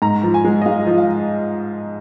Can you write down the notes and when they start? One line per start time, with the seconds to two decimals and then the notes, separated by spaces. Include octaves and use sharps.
0.02 G#2 A#5
0.23 F3
0.34 G#5
0.45 G#3
0.62 D#5
0.66 G#3 F5
0.87 F3
0.98 F5